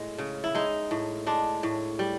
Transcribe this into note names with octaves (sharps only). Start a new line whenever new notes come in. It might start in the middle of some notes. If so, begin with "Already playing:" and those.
Already playing: A2 G#3
C#3
E4
G#3 D#4
A2
G#3 D4
A2
G3